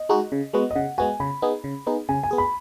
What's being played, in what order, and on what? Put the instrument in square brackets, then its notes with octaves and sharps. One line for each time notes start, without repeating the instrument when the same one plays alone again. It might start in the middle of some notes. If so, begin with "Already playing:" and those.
Already playing: [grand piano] D#5
[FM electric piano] G#3 D#4 F#4
C#3
G#3 B3 F#4
[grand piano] D#5
[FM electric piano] C#3 [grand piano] F#5
[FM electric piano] G#3 B3 F#4 [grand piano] G#5
[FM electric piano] C#3 [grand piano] B5
[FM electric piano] B3 D#4 G#4
C#3
B3 D#4 G#4
[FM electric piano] C#3 [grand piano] G#5
[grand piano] G#5
[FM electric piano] B3 G#4
[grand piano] B5